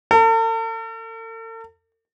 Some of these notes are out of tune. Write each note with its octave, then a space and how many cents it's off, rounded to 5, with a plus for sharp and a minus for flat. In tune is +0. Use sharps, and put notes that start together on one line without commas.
A4 +45